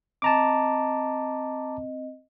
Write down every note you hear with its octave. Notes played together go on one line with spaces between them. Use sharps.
C4 D#5 A5 A#5 D6